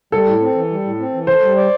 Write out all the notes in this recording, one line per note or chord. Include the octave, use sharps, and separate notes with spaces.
G3 A4
A2
C4
E3
G3
A2
C4
E3
A4 C5
G3
D5